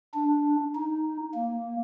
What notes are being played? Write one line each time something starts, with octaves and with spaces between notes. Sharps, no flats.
D4
D#4
A#3